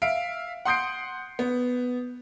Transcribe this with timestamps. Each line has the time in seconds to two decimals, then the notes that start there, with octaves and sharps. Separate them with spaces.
0.02 E5 F5 D7
0.65 F#5 C6 D#6 G6 C7 D7
1.39 B3